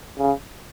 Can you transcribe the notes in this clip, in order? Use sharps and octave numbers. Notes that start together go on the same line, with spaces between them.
C#3